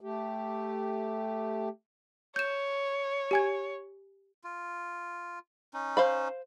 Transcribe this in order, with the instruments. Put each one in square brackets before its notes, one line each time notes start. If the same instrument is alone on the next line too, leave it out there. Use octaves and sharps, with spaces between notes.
[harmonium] A3 G4
[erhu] C#5 [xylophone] G6 E7
[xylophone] G4 G#5 G#6
[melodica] F4
C#4 D#4
[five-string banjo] C5 F5 B5